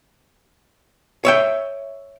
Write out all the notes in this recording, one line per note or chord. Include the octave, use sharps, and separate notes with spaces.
C#5 E5 G5